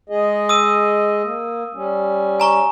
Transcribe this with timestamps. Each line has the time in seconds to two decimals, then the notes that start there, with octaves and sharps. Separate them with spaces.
0.09 G#3 G#4 D#5
0.49 D#6 E6 D#7
1.22 A#3
1.74 G3 C#4
2.40 G#5 A#5 C#6